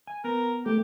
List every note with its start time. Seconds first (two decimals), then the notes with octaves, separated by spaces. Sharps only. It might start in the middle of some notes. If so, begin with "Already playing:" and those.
0.07 G#5
0.24 B3 A#4
0.66 A3 G4